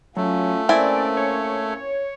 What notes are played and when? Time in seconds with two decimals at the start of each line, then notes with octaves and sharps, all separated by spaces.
0.17 F#3 A3 C#4 F4
0.69 A#3 C4 C#4 E4 D5 G#5
1.17 C#5